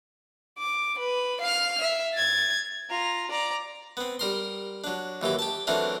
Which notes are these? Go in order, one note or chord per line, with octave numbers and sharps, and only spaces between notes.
D6
B4
F5 F6
E5
G#6 A6
F4 A#5
D5 A#5
B3 C4
G3 A#4 C6
F#3 D4
D#2 E3 F#3 G4
G4 A5
E3 F#3 A3 C4 D4 A#4